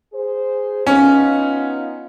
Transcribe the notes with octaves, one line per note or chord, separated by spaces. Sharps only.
G#4 C5
B3 C#4 D#4 F4